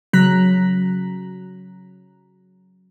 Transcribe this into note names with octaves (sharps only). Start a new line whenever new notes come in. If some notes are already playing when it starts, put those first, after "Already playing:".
C#3 F#3 A#5 F#6 B6